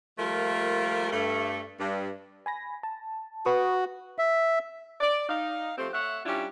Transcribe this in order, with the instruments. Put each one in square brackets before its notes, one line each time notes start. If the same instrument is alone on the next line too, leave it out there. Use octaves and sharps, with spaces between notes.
[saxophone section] F3 G3 A3 A#3 F4 A#4
G2 A3
G2
[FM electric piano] G#5 B5 A#6
A5
[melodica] F#4 [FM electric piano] B4 C#6 D#6
[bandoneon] E5
[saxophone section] D5
D#4 F5
F3 A3 C4 G4 C5
A3 C#5 E5 F#5
G3 C#4 D4 E4 F4 G4